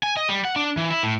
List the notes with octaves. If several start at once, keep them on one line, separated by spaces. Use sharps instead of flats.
G#5
D#5
G3
F#5
D4
E3
E4
A2